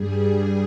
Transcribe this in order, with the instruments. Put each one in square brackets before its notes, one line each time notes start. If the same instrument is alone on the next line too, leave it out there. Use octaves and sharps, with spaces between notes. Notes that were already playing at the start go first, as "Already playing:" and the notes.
Already playing: [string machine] G2 G3 G#4